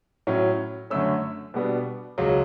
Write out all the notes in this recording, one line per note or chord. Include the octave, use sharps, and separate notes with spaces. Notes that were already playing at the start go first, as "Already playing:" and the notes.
A2 F#3 C#4
F#2 D3 A3 C#4 E6
B2 G3 B3 D4
C#2 C#3 F#3